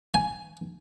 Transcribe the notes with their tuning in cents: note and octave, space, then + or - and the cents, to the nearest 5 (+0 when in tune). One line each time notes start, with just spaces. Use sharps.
G#5 +10